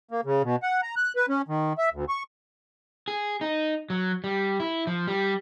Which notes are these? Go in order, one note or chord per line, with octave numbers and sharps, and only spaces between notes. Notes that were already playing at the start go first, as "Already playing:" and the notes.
A#3
C#3
B2
F#5
A#5
F#6
B4
C#4
D#3
E5
D2
C#6
G#4
D#4
F#3
G3
E4
F3
G3